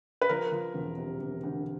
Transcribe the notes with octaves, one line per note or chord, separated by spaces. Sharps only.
B4
F3 A#4
F3
E1
C3
E1
D2